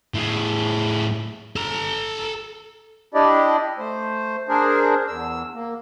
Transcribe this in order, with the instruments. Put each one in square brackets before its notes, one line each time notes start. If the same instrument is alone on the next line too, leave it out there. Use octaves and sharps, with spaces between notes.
[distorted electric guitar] A2 G#4
A4 A#5
[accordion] D4 E4 G4 D5 D#5
A3 C5
D4 G#4 A#4 C5
E2 E6
A#3